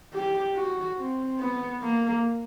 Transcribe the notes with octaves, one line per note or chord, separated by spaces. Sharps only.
G4
F#4
C4
B3
A#3